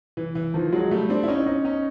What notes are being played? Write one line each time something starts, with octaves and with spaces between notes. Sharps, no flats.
E3
E3
D#3 F3
F#3 G#3
G3 A3
C4 D4
E4
C#4 D#4
C#4 D#4
C#4 D#4